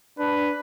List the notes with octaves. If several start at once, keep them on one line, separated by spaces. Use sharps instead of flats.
D4 B4